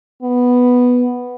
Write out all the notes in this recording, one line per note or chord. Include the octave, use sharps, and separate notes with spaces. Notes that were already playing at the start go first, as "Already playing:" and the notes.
B3